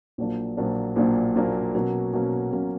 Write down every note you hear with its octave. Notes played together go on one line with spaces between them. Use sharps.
A#1 A#2 F#3 A#3 D4
A#1 A#2 F#3 A#3 D4
A#1 A#2 F#3 A#3 D4
A#1 A#2 F#3 A#3 D4
B2 F#3 A#3 C#4
B2 F#3 A#3 C#4
B2 F#3 A#3 C#4